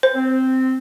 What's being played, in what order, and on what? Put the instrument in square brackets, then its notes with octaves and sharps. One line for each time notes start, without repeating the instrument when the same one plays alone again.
[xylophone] C5
[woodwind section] C4